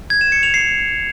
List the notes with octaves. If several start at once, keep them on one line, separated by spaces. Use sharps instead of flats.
G#6
E7
C#7
F7
C7